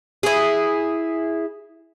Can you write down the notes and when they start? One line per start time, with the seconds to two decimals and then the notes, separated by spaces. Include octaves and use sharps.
0.23 E4 G#4